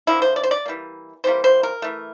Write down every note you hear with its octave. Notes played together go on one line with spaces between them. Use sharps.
D3 F3 A#3 E4
C5
D5
C5
D5
E3 G3 A#3
C3 E3 G3 A#3 C5
C5
A#4
E3 A3